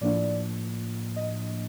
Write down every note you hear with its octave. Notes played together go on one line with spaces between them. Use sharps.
A2 F3 A#3 D4 D5
D#5